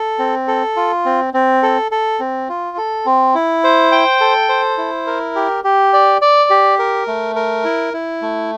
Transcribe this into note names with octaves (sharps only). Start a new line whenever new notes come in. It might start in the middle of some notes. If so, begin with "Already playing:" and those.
Already playing: A4
C4
A4
F4
C4
C4
A4
A4
C4
F4
A4
C4
E4
C5
G5
A4
C5
E4
A#4
G4
G4
D5
D5
G4
A#4
A3
A#4
E4
E4
A3